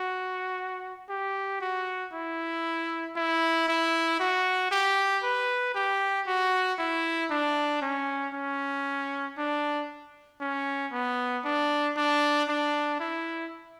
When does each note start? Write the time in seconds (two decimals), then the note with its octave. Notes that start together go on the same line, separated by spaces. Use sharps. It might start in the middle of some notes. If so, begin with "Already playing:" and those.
Already playing: F#4
1.09 G4
1.61 F#4
2.13 E4
3.16 E4
3.68 E4
4.20 F#4
4.71 G4
5.23 B4
5.75 G4
6.27 F#4
6.79 E4
7.30 D4
7.82 C#4
8.34 C#4
9.38 D4
10.41 C#4
10.93 B3
11.45 D4
11.97 D4
12.49 D4
13.00 E4